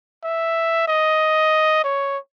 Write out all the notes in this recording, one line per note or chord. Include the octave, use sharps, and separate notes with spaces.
E5
D#5
C#5